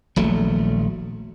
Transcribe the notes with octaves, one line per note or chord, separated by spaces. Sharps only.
D#1 A#1 F#3 A3